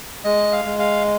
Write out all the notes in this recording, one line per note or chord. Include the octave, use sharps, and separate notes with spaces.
G#3 D#5
F5
G#3
F5